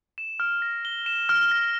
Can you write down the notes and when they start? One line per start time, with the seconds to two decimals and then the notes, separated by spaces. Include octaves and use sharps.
0.18 E7
0.40 F6
0.62 A#6
0.85 G7
1.06 E7
1.29 F6
1.51 A#6